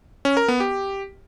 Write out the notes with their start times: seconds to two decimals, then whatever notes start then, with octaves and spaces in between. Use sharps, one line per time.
0.25 C#4
0.37 A#4
0.48 B3
0.60 G4